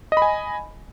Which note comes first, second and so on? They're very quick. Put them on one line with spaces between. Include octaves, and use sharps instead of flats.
D#5 B5 G#5